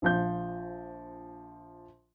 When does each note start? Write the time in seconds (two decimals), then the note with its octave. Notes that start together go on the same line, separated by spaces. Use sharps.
0.02 A#1 F3 G6